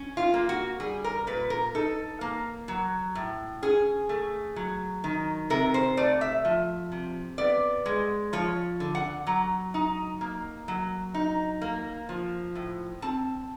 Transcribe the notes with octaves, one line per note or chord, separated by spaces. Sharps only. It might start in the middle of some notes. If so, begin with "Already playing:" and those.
Already playing: C#4
F4
A#3
F#4
G3 G#4
A#4
A#2 B4
A#4
D#4 A4
A#3
F#3
A2
C#4 G#4
A3
F#3
D#3
C3 A#4
C5
A3 D5
E5
F3
C3
B3 D5
G#3
F3 C#5
D3
F#5
F#3 A#5
D#4
A#3
F#3
D#4
A#3
F3
A2
C4 A5